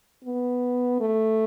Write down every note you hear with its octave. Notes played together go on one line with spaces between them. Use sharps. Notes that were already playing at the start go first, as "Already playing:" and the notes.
B3
A3